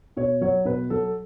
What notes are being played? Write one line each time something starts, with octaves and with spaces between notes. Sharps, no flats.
B2 C#5
F#3 C#5
B2 B4
F#3 A4